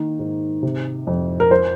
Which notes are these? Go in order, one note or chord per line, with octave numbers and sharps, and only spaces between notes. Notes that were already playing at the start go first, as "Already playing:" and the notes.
Already playing: D#3 A#3
G#2
C3
F2
A#4
F3 C5